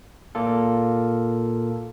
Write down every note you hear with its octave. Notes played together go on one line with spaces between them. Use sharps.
A#2 A#3 F4 A4